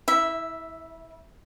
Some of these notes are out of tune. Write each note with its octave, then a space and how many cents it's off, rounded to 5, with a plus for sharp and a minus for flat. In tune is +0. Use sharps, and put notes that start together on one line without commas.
E4 -25 E5 +0